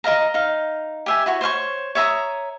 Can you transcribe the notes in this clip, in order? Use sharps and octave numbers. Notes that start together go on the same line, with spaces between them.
A#4 D#5 F5 A#5
D#4 F5
G4 E5 G#5
E4 F#4 C#5
C5 C#5 F5 C#6
C#5 E5 A#5 D#6